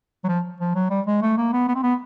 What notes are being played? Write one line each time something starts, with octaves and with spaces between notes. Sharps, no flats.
F#3
F3
F3
F#3
G3
G#3
A3
A#3
B3
B3
C4
B3